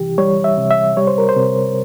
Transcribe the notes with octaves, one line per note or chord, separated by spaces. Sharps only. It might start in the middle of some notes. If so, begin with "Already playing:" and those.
Already playing: C2 E3 G4
G3 C#5
E5
C3
E5
G3 C#5
C5
A#4
C5
C3